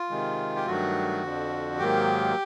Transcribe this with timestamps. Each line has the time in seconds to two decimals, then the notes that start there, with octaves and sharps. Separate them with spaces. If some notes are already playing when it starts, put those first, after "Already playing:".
Already playing: F4
0.10 C3 D#3 G#3
0.56 G4
0.66 G2 D#3 F#3 A3 F#4
1.23 F2 D3 F3
1.78 G#2 D#3 F#3 A#3 G4